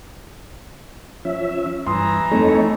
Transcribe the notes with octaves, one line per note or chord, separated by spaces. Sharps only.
F3 C#4 E5
G2 E3 A#5 C6 D#6
F2 A3 D#4 A4 C#5